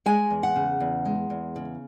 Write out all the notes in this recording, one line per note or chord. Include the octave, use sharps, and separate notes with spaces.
G#3 G#5
E2
F#5
C#3
E2
G#3
E2
C#3